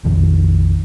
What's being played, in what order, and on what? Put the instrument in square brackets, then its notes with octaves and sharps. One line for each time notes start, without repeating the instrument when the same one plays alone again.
[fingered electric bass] A#1 F2 D#3